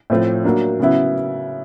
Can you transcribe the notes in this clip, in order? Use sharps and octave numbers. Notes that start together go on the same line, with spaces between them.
A2 F3 A3 C4
F#3 A#3 D4
C#3 F#3 B3 E4